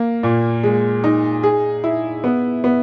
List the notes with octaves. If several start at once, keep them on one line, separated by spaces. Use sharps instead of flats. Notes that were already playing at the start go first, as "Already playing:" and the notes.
Already playing: A#3
A#2
G#3
D#4
G#4
E4
B3
B3